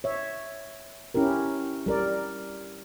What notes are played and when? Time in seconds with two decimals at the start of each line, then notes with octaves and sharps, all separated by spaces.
0.04 C#5 E5
1.15 C#4 E4 G4 A#4
1.86 G3 A#4 D5